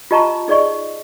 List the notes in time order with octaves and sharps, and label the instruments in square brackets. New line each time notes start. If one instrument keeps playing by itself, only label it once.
[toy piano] F4 G4 D#5 A5 A#5 C#6
D#4 G#4 D5 D#5 C#6